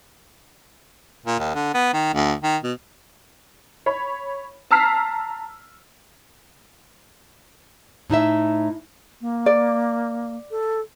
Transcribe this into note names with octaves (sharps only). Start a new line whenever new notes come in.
A#2
D#2
D3
B3
D#3
D2
D#3
B2
C#5 B5
A5 A#5 E6 F6 B6 C7
A2 D#4 E4 E5
A#3
D5
A4